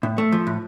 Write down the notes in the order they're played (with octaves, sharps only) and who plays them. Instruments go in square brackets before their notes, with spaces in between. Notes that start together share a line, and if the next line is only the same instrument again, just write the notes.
[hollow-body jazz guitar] A2
A3
F3
A2